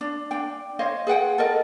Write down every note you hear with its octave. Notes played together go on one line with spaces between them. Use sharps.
D4
D4 G5
C5 C#5 D#5 F5
G#4 B4 F#5 G5
A4 A#4 D#5